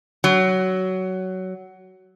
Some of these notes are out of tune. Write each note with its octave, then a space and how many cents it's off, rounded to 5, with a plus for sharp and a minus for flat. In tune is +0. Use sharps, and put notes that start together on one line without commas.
F#3 +15